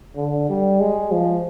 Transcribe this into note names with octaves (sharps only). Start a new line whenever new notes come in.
D3
G3
G#3
F3